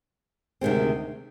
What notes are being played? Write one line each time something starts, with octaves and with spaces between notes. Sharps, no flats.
D2 C3 D#3 G#3 C4